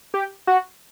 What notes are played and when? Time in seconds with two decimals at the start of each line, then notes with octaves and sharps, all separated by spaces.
0.14 G4
0.47 F#4